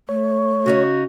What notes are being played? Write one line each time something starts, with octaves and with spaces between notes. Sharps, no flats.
A3 C#5
C#3 C#4 D#4 F#4